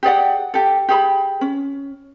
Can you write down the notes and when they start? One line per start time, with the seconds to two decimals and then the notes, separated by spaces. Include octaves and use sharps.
0.03 G4 G#4 D5 F#5
0.54 G4 A4
0.89 G4 G#4 B5
1.41 C#4